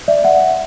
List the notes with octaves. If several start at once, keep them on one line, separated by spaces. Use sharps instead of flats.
D5 E5
E5 F#5